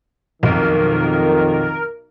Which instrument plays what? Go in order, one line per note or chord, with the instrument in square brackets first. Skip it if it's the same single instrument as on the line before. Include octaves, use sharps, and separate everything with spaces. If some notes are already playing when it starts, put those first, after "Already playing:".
[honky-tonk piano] B1 [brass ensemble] F2 D#3 [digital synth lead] A#4